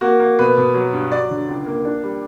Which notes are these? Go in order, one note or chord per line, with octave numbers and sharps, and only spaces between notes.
A#3 F#4
A#3
B2 B4
B2
F#3
G2
F#3 D5
D3
C#2
A#3
D4
G3